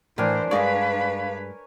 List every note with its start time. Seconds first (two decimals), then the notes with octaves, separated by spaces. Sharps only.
0.18 A2 E3 D4 A#4 C5 G#5
0.51 G2 G#3 D4 B4 C#5 D5 F5 G#5